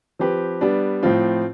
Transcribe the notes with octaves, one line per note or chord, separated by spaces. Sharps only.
F3 C4 G4 B4
G3 B3 D4
A2 F3 C4 F4